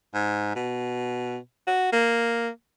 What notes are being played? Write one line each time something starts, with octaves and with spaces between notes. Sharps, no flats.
G#2
B2
F#4
A#3